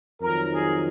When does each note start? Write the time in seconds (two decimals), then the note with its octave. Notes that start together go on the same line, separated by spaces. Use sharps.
0.22 F2 D#3 F#3 A#4
0.52 G#4